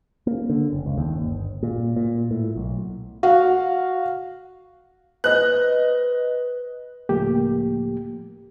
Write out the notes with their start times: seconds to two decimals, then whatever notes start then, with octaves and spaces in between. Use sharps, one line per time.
0.27 A#3
0.50 D3
0.73 F#1
0.86 C#2
0.98 D#2
1.14 G1
1.63 A#2
1.96 A#2
2.31 A2
2.56 B1
3.23 F#4 F5
5.24 B4 C5 D#5 F#6
7.09 C#2 A2 F3 A3 A#3 G4